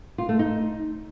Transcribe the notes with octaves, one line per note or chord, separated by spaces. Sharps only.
F4
A3
D#4